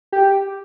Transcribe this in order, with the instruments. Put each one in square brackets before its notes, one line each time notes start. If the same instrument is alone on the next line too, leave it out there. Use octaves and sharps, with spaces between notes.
[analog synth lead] G4